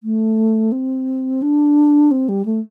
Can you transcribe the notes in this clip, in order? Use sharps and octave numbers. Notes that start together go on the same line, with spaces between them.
A3
C4
D4
C4
G3
A3